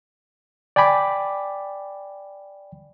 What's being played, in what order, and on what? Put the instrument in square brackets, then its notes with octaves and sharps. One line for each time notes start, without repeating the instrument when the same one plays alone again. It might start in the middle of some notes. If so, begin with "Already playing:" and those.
[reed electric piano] D5 G5 G#5 B5 D6